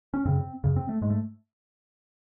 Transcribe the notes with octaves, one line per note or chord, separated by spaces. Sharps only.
C#4
F#2 C#3 C4
F#2 C#3
C4
A3
G#2 G#3
A3